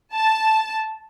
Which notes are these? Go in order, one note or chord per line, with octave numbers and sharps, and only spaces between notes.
A5